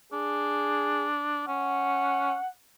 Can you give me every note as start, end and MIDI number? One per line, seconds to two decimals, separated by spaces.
0.12 1.45 62
0.12 1.08 68
1.48 2.34 61
1.48 2.50 78